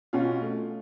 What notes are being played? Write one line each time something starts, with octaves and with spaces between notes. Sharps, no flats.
B2 C#4 F4
A3